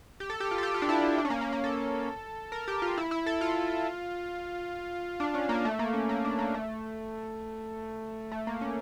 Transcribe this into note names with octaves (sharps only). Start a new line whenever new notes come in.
G4
A4
G4
F4
A4
G4
F4
D4
E4
D4
C#4
A#3
A#3
A#3
A4
A#4
G4
F4
E4
E4
A4
F4
D4
C#4
A#3
A3
A#3
C#4
A#3
D4
A#3
A3
A3
A#3
C#4